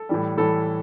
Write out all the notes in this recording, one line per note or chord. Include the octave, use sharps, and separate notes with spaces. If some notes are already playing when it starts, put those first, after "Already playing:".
Already playing: A4
A2 E3 G3
A2 E3 G3 A4